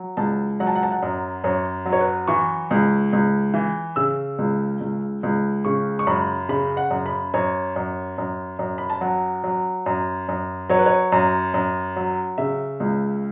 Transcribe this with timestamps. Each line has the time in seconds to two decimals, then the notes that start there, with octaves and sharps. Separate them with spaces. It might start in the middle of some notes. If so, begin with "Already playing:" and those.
Already playing: F#3
0.17 C#2 A5
0.60 F#3 F#5
0.67 A5
0.75 F#5
0.83 A5
0.91 F#5
1.02 F#2
1.44 F#2 C#5
1.86 F#3
1.93 C#5
2.00 B4
2.28 E3 C#6
2.71 C#2
3.13 C#2
3.54 E3
3.96 C#3 E6
4.39 C#2
4.80 C#2
5.23 C#2
5.65 C#3 C#6
5.99 C#6
6.07 F#2 B5
6.49 C#3 B5
6.77 F#5
6.90 F#2
7.06 B5
7.34 F#2 C#5
7.76 F#2
8.18 F#2
8.59 F#2
8.78 B5
8.90 A5
9.01 F#3 F#5
9.44 F#3
9.86 F#2
10.28 F#2
10.69 F#3 C#5
10.78 B4
10.86 C#5
11.12 F#2
11.54 F#2
11.96 F#3
12.38 C#3 E5
12.80 C#2